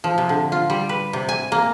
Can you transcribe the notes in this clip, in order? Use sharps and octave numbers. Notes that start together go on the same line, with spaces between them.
F3
C3
D3
F4
G3
B4
C3
G#5
A#3